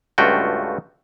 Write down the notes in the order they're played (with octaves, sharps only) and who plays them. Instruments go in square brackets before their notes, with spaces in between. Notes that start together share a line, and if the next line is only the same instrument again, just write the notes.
[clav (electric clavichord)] C#2 G2 A3 F4 F#4 G5